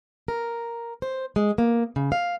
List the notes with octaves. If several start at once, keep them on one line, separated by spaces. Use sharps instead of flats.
A#4
C5
G#3
A#3
C#3
F5